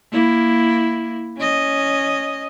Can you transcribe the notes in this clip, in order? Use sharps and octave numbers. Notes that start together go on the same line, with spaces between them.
A#3 E4
C#4 D#5